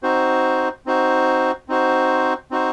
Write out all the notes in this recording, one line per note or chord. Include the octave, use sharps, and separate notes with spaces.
C4 D#4 F#4 C5
C4 D#4 F#4 C5
C4 D#4 F#4 C5
C4 D#4 F#4 C5